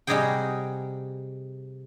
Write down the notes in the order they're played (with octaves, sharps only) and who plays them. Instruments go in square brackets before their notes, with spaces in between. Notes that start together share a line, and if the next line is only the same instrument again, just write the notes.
[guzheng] C3 G3 D#4 F#4 G#4 G5